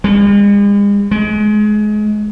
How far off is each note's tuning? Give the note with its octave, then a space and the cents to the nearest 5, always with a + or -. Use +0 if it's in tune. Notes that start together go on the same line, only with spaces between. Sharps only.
G#3 -45
G#3 +25